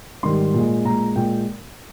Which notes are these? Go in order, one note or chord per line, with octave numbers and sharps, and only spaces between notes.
G#2 D#3 G3 C6
A#2 G#3
A#2 G#3 A#5
A#2 G#3 G5